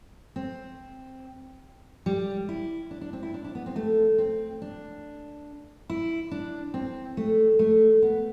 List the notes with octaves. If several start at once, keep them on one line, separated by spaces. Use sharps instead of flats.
C4
G3
E4
D4
D4
C4
E4
D4
D4
B3
C4
A3
C4
D4
E4
D4
C4
A3
A3
B3